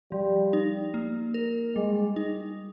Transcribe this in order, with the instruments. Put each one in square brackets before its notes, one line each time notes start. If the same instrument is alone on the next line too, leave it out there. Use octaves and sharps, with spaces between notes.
[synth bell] F3 [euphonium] G3
[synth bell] D#4
A#3
A#4
[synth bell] G3 [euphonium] G#3
[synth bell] D#4